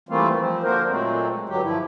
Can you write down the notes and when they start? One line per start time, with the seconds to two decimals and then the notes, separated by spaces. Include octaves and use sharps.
0.09 E3 G3 A3 A#3 C4 F4
0.39 F3 C4
0.64 D3 F3 A#3 F#4 A#4 C5
0.88 A#2 F#3 G#3 A3 C4
1.49 G2 D3 F#3 G4
1.64 F3 E4